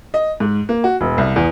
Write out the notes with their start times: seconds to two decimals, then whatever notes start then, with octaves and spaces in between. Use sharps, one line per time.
0.14 D#5
0.40 G#2
0.69 A#3
0.84 F#4
1.01 E1
1.18 C2
1.36 E2